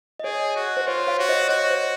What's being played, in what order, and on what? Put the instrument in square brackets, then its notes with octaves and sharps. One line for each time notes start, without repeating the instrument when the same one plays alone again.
[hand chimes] D#5
[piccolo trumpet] G#4 [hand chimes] C#5
[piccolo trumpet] F#4
[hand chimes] C5
[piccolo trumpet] F4 [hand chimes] C#5
[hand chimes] C#5 F5
[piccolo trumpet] F#4
[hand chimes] C5 D#5
[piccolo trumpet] F#4 [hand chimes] C#5
[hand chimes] C5